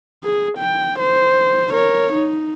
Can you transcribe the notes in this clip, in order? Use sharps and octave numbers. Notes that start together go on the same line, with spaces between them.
G#4
G5
C5
A#4 C#5
D#4